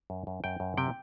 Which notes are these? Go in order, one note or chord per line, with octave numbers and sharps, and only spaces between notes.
F#2
F#2
F#2 G5
F#2
C3 G5